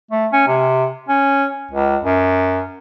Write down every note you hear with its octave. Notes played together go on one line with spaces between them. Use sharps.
A3
C#4
C3
C#4
C#2
F#2